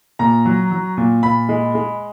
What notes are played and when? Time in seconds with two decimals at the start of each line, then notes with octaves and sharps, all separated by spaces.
0.19 A#2 A#5
0.45 F#3
0.72 F#3
0.97 A#2
1.23 A#2 B5
1.49 G#3
1.75 G#3